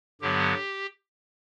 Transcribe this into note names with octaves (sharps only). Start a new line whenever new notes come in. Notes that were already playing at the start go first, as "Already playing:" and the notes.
G2 D3 F#3 B3 G4